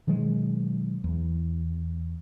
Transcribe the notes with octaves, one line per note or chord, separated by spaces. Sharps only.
B2 D#3 F#3 G#3
E2